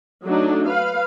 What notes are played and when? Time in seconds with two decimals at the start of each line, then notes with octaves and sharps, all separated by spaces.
0.24 F#3 A3 D4 D#4
0.67 B4 F5